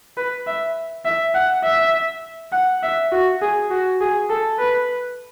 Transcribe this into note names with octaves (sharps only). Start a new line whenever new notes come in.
B4
E5
E5
F#5
E5
F#5
E5
F#4
G#4
F#4
G#4
A4
B4